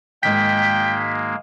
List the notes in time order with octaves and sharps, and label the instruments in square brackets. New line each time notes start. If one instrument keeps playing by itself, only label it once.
[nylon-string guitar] G#2 D#3 F#3 [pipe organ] G#3 A#3 [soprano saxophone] G5 [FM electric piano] B6